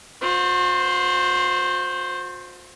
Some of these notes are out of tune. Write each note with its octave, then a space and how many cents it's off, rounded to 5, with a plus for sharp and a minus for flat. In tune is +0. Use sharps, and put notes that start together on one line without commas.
F#4 -45 C5 +0